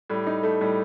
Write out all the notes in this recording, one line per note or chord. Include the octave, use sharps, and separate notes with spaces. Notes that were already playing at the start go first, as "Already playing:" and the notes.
A2 G3
D#4
A3
A2 G3